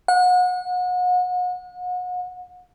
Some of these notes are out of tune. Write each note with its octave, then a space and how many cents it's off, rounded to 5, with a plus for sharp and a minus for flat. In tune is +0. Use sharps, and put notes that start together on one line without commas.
F#5 -35